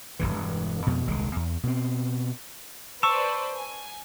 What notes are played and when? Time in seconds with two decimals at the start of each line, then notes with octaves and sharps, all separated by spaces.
0.19 E1 B1 G2 E3
0.86 F2 B2
1.07 D#1 C2 D#3 G#3
1.36 E2
1.63 B2 C4
3.03 B4 C5 D5 A5 C#6 E6
3.57 G#5